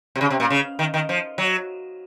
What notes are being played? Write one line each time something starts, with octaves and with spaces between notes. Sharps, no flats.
C3
C#3
C3
A#2
C#3
D#3
D#3
F3
F#3